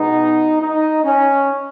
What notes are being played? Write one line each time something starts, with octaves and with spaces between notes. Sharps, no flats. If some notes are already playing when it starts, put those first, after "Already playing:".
Already playing: B2 G#3 B3 D#4
D#4
C#4